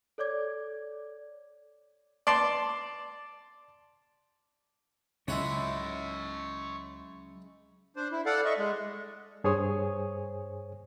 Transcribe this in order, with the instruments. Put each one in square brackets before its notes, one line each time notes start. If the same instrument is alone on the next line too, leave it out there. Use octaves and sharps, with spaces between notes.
[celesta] A4 C#5 D5 D6 G#6
[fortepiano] D5 A5 C6
[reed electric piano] C#2 [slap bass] F#3 C#4 [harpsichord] G#3 E4 F#5 [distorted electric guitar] C#5 E5
[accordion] D4 C5
E4
A4 D5 F5 F#5
D#5 E5 C#6
G#3
[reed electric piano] G2 G#4 C5 C#5 G#5 D#6